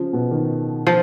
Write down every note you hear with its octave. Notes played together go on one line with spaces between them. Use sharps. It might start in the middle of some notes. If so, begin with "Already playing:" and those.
Already playing: C#3 F3
B2
D#3
F3